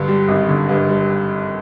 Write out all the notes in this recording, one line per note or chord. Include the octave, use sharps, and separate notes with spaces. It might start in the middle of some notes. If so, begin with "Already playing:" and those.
Already playing: G2 D3
G3
G#1
D3
G2
G3